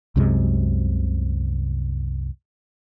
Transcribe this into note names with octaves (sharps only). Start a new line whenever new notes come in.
C2 F#2 C3 G#3